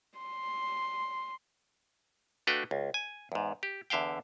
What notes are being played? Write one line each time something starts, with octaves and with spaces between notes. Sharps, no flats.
C6
A3 D4 F#4 B4 F5 G5
C#2
G#5
E2 G#2
G4
E2 D3 E5 F5 G5